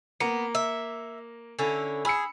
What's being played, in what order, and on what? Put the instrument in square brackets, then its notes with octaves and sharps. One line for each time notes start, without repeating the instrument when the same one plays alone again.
[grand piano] A#3 A#5 C#7 [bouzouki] B3
[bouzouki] E5
D3 C#4 E4
[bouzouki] G#4 [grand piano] B5 E6 C#7